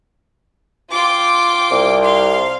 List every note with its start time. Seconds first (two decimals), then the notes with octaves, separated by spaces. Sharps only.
0.90 F4 G5 C6 D6
1.71 C2
2.03 F5 C6